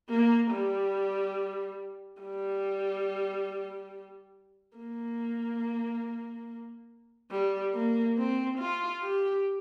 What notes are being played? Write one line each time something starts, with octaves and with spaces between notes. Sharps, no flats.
A#3
G3
G3
A#3
G3
A#3
C4
F4
G4